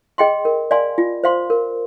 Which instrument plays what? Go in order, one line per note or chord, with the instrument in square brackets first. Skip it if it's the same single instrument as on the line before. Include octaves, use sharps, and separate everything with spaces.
[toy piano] G#4 D#5 G5 C6
A#4
D5 F5 G#5 C6
F4
C5 F5 C6
A#4